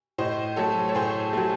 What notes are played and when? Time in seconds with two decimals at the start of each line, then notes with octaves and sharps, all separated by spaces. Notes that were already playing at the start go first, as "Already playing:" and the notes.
0.18 A2 C5 D#5
0.56 F#3 A3 A4 C#5
0.89 C#5
0.95 A2 G#4 C5
1.33 F#3 A3